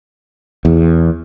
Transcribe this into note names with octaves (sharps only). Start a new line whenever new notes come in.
E2